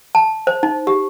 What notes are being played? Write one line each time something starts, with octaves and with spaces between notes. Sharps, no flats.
A5
C5
D#4
G4